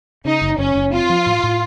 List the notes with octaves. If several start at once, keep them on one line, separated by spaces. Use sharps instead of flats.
C#3 D#4
F#1
F#1 C#4
F#1
C4 F4
F3
A2
A2